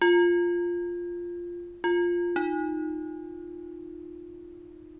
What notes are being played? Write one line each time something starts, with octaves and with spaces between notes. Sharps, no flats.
F4
F4
D#4